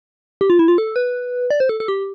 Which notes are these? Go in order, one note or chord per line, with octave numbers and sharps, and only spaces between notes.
G4
F4
E4
F4
A4
B4
D5
C5
A4
A4
G4